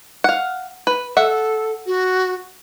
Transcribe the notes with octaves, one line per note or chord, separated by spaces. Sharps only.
F5 F#5
B4
A4 E5 F#5
F#4